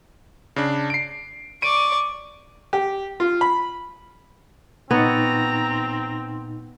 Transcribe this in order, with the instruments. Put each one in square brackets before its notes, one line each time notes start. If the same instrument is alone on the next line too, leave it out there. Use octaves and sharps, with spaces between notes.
[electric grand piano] C#3 D4
C7 D7
[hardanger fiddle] D5 C#6 [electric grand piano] D7 D#7
[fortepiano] G4
F4
B5
[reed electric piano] A#2 D#4 A6 [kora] B3 C#5 [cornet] C4 [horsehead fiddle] A#5